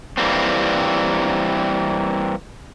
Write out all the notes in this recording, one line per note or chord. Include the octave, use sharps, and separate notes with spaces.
E3 G3 A#3 C4